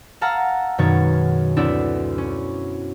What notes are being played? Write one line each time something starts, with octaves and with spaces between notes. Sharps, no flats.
F5 F#5 A5 A#5 E6 F6
F#2 B2 D#3 G#3 C#5 A6
D2 B3 C4 D4 E4 E6
C#4